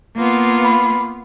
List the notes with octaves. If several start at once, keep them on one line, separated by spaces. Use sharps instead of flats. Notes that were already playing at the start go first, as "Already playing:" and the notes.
A#3 B3 F4
B5